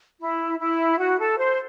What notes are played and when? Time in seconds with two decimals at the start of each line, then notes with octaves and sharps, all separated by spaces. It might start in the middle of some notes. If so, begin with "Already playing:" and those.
0.20 E4
0.59 E4
0.98 F#4
1.19 A4
1.38 C5